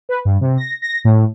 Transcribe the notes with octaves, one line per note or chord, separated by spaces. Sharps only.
B4
G2
C3
A#6
A#6
A2